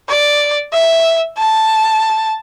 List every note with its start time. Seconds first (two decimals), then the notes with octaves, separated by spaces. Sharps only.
0.08 D5
0.73 E5
1.38 A5